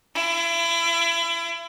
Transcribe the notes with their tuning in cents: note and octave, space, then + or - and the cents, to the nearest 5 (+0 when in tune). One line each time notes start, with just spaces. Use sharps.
E4 +35